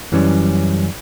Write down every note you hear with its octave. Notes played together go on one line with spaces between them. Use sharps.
F#2 E3 G3 C#4